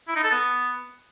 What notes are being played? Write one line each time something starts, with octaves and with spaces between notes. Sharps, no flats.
E4
D#4
A4
B3